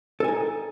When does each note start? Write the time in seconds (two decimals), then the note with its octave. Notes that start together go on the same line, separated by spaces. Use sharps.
0.20 A4
0.24 G#5
0.28 D#4